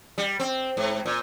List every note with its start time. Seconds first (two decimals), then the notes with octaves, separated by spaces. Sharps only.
0.18 G3
0.40 C4
0.77 G#2
1.06 A#2